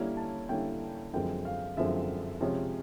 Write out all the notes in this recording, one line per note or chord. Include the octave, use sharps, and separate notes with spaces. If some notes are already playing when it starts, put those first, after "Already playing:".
Already playing: D3 G3 A#3 C#4 E4
A5
D3 G3 A#3 C#4 E4 G5
F#2 D3 F3 G#3 C4 G5
F5
F#2 D3 F3 G#3 C4 E5
C3 F3 G#3 C#4